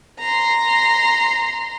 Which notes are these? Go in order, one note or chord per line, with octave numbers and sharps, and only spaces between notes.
A#5 C6